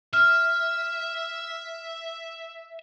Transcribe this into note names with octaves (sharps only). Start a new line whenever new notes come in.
E5 F6